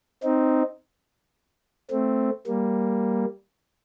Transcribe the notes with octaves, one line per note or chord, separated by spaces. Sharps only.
C4 D#4
A3 C4
G3 A#3